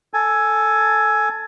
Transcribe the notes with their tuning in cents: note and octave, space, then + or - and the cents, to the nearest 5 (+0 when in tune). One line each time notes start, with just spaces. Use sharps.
A4 +0 G#5 +10